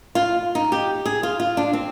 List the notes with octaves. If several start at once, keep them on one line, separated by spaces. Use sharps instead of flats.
F4
D#4
G4
G#4
F4
F4
D4
C4